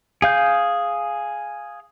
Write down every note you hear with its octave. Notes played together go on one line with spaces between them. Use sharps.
G#4 F5 G6